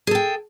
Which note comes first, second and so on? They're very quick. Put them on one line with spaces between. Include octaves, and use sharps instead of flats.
G#4 A4 G5